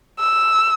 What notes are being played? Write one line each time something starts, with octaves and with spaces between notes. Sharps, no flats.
E6